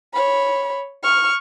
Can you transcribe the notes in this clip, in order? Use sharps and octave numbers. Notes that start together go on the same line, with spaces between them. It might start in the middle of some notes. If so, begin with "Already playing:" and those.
C#5 B5
C#6 F6